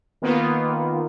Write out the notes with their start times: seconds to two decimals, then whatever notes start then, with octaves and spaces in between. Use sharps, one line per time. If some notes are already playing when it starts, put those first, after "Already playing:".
0.22 D#3 A#3 B3 F4